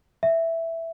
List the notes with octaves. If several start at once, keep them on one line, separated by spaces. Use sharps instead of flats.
E5